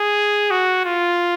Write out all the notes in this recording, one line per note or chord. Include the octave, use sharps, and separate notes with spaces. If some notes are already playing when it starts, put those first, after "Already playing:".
Already playing: G#4
F#4
F4